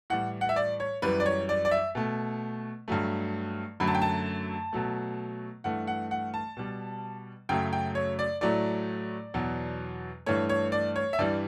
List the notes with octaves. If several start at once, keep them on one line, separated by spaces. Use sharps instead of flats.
A2 E3 G3 F#5
F#5
E5
D5
C#5
F#2 E3 G3 B4
D5
C#5
D5
D5
E5
B2 A3
G2 F#3 A3
F#2 D3 F#3 A3 B5
A5
G5
A5
B2 F#3 A3
G2 E3 A3 F#5
F#5
F#5
A5
B2 G3
F#2 C#3 F#3 A3 G5
G5
C#5
D5
A2 F#3 A3 D5
E2 B2 F#3
G2 E3 A3 C#5
C#5
D5
C#5
E5
G2 E3 G3 D5